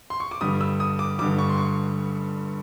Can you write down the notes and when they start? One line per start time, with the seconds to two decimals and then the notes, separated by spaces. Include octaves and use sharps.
0.10 C6
0.20 C#6
0.31 D6
0.41 G2 D3 G3 D#6
0.61 E6
0.80 D#6
0.99 D6
1.19 G2 D3 G3 D6
1.39 C#6
1.49 C6
1.58 C#6